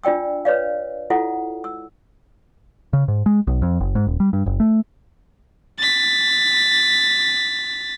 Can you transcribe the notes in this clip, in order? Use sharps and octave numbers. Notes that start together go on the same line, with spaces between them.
D4 F4 D5 G5 E6
B4 C#5 D5 F5
E4 F4 A4 F#5
E6
C#3
G#2
G#3
B1
F2
F#1
G#2
D#1
G3
G2
F#1
A3
A6 B6